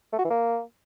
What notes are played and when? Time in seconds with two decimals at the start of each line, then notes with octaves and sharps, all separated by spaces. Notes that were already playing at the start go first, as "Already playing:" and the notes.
0.13 A3
0.19 F#4
0.25 E3
0.30 A#3